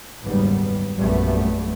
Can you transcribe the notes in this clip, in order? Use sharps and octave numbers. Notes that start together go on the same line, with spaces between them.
F#1 D#2 G#2 G3 B3
A#1 F#2 G3 A3 B3